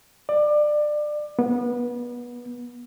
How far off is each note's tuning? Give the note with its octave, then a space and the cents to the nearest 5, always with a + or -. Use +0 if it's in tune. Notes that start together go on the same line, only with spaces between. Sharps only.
D5 +25
B3 -25